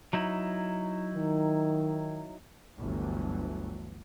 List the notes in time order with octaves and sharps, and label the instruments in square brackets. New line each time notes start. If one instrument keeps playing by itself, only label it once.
[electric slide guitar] F#3 D#4 E4
[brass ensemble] D#3
[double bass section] G1 D2 E3 F#3 A3